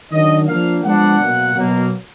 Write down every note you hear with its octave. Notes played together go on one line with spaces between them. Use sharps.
D#3 F#3 D4 D#5
F3 A#3 D4 F5
F3 G#3 B3 D4 F#5
B2 F#3 A#3
B2 F#3 A#3